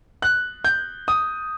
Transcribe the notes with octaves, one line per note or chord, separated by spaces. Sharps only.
F#6
G6
D#6